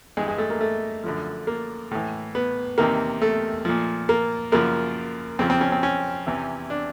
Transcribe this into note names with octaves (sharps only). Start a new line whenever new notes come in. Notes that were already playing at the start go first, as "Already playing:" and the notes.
G2 E3 G#3
G#3
A3
A#3
A3
F#2 D3 F3
A#3
A2 E3
B3
E2 C3 D#3 A#3
A3
A#2 F3
A#3
F#2 C#3 F3 A#3
F2 C#3 F3 C4
C4
C#4
C4
C#4
E2 C3 E3
D4